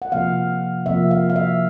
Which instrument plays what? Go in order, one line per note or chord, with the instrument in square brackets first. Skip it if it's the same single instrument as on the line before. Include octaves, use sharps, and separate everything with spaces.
[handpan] F#5
C3 F3 A#3 F5
C3 F3 A#3 E5
F5
F5
E5